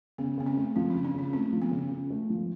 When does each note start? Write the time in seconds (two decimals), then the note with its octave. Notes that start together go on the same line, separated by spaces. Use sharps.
0.18 C#3 B3
0.38 C#3 B3
0.46 C4
0.57 A3
0.76 F3 C4
0.90 C#4
0.95 C#3
1.05 D4
1.14 C#3 C#4
1.33 A3 C4
1.53 F3
1.62 B3
1.71 C#3
1.92 C#3
2.10 A3
2.30 F3